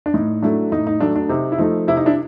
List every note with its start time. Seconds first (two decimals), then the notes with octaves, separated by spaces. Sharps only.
0.06 D4
0.14 A2 D#4
0.42 F#3 A3 D4 E4
0.72 A2 D#4
0.87 D#4
1.00 F#3 A3 D4
1.16 D4
1.29 C3 D#4
1.52 E4
1.59 F3 A3 D#4
1.87 C3 E4
1.97 D#4
2.06 D4 E4